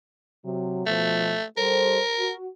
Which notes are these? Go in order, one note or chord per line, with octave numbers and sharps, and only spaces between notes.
C3 F#3
B2 F3 A3
G3 A4 A#4 C5
F#4